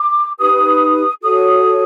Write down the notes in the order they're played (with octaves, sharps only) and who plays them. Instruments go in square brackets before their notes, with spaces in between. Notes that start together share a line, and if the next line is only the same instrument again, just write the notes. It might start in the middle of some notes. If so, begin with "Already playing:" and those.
Already playing: [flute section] D6
D#4 G4 B4 D#6
F#4 A4 C#5 D#6